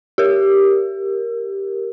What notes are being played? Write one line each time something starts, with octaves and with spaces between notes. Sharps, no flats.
G4 A#4